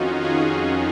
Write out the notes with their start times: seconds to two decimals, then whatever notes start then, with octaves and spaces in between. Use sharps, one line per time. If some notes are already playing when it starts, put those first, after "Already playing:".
Already playing: F2 D#3 C#4 D#4 F4 F#4
0.21 F4 G#4